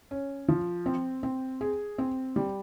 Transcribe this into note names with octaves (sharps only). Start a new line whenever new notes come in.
C#4
F3
C4
C4
G#4
C4
G3